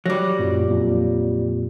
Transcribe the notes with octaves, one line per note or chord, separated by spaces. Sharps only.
F#3 G3 D6 A#6
F#2 A#2
F2 A#2